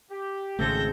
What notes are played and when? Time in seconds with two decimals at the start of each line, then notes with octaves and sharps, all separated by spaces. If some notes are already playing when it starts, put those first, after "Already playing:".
0.11 G4
0.59 G#1 C#3 G#3 A3 C4 A4 G6 A#6